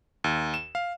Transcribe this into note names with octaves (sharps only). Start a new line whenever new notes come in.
D#2
E7
F5